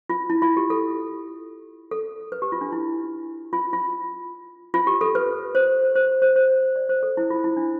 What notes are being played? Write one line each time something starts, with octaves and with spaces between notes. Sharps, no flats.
F4
E4
F4
G4
A4
A4
B4
G4
F4
D4
E4
F4
F4
F4
G4
A4
B4
C5
C5
C5
C5
D5
C5
A4
E4
F4
E4
D4